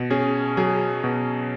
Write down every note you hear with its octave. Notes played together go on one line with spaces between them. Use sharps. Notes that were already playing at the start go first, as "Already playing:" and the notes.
Already playing: B2
C#4 G#4
F#3 G#4
B2